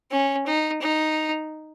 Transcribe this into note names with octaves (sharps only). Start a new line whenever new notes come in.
C#4
D#4
D#4